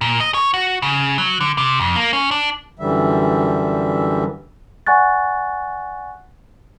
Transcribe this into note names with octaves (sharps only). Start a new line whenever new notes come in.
A#2
D#5
C#5
F#4
C#3
F#3
D3
C3
F2
A#3
C#4
D4
F#2 D3 E3 G3 E5
D5 F#5 G#5 C#6 F#6 A6